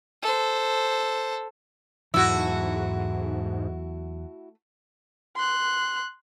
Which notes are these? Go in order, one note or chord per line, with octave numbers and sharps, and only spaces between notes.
A4 C5
E2 G#2 F#3 A3 E4 F#4 E6
C6 F#6